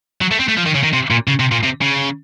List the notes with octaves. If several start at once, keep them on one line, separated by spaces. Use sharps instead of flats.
F#3
A3
C4
A3
F3
D#3
C#3
D#3
C3
A#2
C#3
C3
A#2
C3
C#3